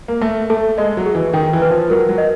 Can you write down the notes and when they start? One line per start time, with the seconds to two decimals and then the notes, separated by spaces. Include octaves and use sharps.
0.08 A#3
0.21 A3 E5
0.50 A3 A4
0.78 G#3 D#5
0.97 F#3
1.06 G#4
1.15 E3
1.33 D#3 G5
1.53 E3
1.62 B4
1.71 F3
1.90 F#3 A#4
2.09 F#3
2.18 D#5